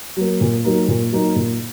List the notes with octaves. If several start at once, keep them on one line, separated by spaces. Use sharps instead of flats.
F#3 A#3
A#2
F#3 A#3 D#4
A#2
F#3 A#3 D#4
A#2